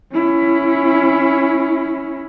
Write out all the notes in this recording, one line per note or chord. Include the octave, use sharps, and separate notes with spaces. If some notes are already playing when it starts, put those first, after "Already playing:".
C#4 E4